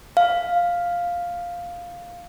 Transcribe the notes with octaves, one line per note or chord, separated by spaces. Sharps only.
F5